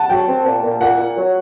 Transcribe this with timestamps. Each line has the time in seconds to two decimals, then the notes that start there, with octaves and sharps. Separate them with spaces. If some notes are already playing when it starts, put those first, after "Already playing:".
Already playing: F#5 A5
0.10 F#3 G5
0.28 C4
0.45 A#2
0.63 A#2
0.81 A#2 F#5
0.98 A#2
1.17 F#3